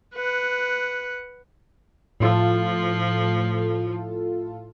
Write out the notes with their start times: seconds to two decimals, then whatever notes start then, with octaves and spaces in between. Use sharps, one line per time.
0.15 B4 F#5
2.20 A2 F3 F4 A4